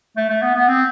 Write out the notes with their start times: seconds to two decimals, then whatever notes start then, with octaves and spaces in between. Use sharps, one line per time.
0.17 A3
0.30 A3
0.42 B3
0.55 B3
0.68 C4